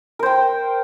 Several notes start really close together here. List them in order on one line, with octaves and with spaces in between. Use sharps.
A#4 C5 G5